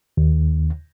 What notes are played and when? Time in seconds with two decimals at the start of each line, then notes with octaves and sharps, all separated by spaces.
0.17 D#2